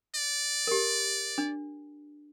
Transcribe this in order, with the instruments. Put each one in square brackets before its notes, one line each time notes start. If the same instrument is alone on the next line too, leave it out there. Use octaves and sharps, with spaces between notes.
[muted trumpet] D5
[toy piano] G4 A#4
D4